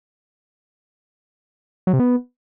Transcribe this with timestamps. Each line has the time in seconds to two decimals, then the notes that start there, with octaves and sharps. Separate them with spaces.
1.87 F#3
1.93 C3
2.00 B3